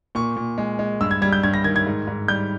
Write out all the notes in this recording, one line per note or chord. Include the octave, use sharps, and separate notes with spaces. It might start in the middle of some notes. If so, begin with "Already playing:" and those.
A#2 C#6
A#2
G#3
G#3
G2 E6
G#6
G3 G#6
G6
G2 G#6
A#6
D#3 G#6
G#6
G#2
G#2
G3 G6